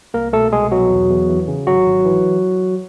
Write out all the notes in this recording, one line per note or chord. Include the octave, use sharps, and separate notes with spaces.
C2 A#3 A#4
B2 A3 A4
C2 G#3 G#4
B2 F#3 F#4
E2
E2
E3
C#3
G#1 F#3 F#4
G#1
E3